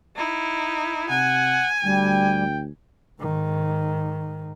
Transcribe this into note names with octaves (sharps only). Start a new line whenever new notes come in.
D#4 E4
C3 F#5 G#5
D2 G3 G5
G#2 D#3